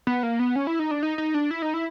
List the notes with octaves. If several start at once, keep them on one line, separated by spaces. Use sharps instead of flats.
B3
A#3
B3
C#4
E4
D#4
D4
D#4
D#4
D4
E4
D#4
E4